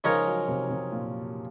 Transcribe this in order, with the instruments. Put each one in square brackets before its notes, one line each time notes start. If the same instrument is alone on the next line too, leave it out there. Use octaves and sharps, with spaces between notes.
[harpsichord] C#3 G#3 D#4 A#4 C#5 [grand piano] F3
[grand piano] F#3
C3
C3
A#2